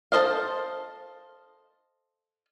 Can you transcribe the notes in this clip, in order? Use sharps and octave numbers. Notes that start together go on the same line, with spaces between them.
A4 B4 C5 D#5 F5